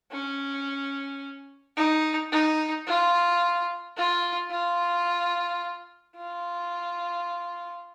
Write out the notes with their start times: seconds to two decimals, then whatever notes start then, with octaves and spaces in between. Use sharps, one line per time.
0.12 C#4
1.77 D#4
2.32 D#4
2.87 F4
3.97 F4
4.51 F4
6.17 F4